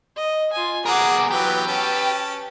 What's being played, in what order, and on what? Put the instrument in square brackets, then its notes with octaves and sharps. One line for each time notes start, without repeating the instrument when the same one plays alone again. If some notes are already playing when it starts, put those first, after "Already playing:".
[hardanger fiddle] D#5
F4 G#5
[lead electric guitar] B3 A#4 [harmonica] G#4 [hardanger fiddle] F#5 D6
[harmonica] E3 F#3 B3 [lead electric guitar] G4 [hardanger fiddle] B4
[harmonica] C#4 A5